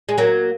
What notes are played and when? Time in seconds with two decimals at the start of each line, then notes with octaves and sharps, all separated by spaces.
0.09 G#3
0.18 F#3 A#3